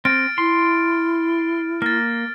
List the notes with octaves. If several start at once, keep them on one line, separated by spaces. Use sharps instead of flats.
C4 F6 A6 D7
E4 C6
A#3 F6 A6